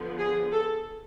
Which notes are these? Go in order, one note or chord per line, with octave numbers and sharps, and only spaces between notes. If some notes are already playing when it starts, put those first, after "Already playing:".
Already playing: D3 F3 B3
G#4
A4